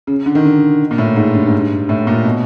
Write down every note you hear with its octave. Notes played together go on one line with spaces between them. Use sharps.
C#3
D3
D#3
D3
A#2
A2
G#2
G2
G#2
G2
A2
A#2
B2